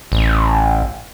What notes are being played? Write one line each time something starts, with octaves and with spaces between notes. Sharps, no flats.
A1